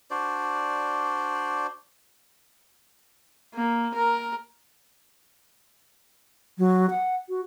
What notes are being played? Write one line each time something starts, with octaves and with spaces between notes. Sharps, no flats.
D4 F#4 C5 D5
A#3
A#4
F#3
F#5
F#4